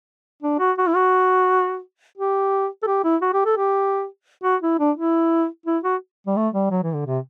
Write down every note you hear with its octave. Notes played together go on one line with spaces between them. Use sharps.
D4
F#4
F#4
E4
F#4
G4
A4
G4
E4
F#4
G4
A4
G4
F#4
E4
D4
E4
E4
F#4
G3
A3
G3
F#3
E3
D3
C3